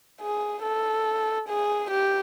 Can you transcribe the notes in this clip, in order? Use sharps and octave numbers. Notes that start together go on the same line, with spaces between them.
G#4
A4
G#4
G4